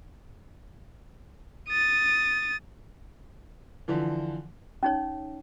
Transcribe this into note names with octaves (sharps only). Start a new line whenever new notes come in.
D#6 A6
D3 E3 F3
C#4 D#4 C#5